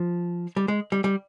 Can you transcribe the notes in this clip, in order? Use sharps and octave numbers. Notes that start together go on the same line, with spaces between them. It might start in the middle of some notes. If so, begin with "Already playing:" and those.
Already playing: F3
G3
G#3
G3
G3